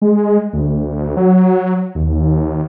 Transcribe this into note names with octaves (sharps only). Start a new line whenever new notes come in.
G#3
D2
F#3
D#2